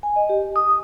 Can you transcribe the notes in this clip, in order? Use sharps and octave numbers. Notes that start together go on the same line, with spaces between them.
G#5
D#5
G4
D#6